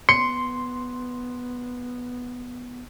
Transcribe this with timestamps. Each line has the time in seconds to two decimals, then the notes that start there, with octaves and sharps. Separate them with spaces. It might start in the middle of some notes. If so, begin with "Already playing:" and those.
0.09 B3 C6 C#7